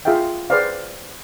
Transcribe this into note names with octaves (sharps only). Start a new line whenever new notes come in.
F4 G#4 E5 F5 G5
G#4 B4 C5 D5 F5